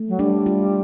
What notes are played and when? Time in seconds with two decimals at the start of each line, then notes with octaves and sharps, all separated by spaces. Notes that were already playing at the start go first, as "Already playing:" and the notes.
Already playing: A3
0.08 F#3
0.19 G3 D4
0.46 F4